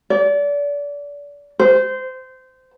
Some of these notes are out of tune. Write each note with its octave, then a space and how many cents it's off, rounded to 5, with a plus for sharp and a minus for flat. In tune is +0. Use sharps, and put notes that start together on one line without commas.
D5 -30
C5 -20